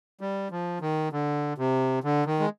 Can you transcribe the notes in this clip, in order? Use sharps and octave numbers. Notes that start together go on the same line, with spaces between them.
G3
F3
D#3
D3
C3
D3
D#3
G#3